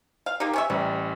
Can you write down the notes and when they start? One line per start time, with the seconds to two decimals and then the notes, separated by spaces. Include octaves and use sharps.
0.26 F5
0.40 A#3 D#4 G4
0.53 C#4 C#5 E5
0.70 A1 C3 G3 B4